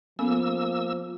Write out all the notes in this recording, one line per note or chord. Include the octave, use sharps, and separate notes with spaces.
F3 A#3 B3 C#4 A4 E6